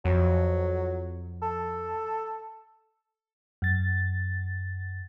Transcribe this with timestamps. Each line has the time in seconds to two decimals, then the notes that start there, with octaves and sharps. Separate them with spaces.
0.05 F2 F#3
1.42 A4
3.62 F#2 A6